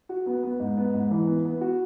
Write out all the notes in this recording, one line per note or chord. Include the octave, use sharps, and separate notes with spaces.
F#4
B3
B3
G#2
B3
G#2
E3
B3
B3
F#4